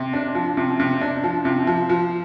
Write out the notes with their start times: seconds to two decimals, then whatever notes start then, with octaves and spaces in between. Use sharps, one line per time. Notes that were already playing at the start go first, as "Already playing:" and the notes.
Already playing: C3
0.13 D4
0.35 F3
0.57 C3
0.80 C3
1.01 D4
1.24 F3
1.45 C3
1.67 F3
1.89 F3